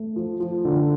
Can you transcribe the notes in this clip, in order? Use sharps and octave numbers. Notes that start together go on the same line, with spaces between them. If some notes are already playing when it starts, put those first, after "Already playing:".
Already playing: A3
F3
F3
D3